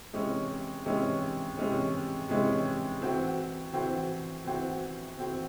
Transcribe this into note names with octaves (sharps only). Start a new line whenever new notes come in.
C3 E3 G#3 C#4
C3 E3 G#3 C#4
C3 E3 G#3 C#4
C3 E3 G#3 C#4
E3 C4 F#4
E3 C4 F#4
E3 C4 F#4
E3 C4 F#4